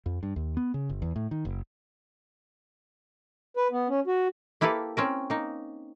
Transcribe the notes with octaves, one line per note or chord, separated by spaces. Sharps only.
F2
G2
D#2
B3
C#3
G1
E2
A2
D#3
F#1
B4
B3
C#4
F#4
A#3 E4 G4 A4 B4 F5
C4 C#4 A#4
A#3 D#4